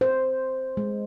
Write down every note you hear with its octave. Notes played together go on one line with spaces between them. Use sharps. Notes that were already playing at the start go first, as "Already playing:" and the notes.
C5
G#3